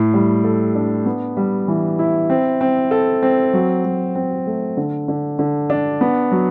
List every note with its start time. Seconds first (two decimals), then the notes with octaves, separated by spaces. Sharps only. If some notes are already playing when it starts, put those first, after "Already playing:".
Already playing: A2
0.14 G3
0.44 A4
0.75 D4
1.06 B3
1.37 G3
1.68 E3
1.99 E4
2.30 C4
2.61 C4
2.91 A4
3.23 C4
3.53 F#3
3.84 F#3
4.15 C4
4.46 A3
4.77 D3
5.08 D3
5.39 D3
5.70 D4
6.01 B3
6.32 F#3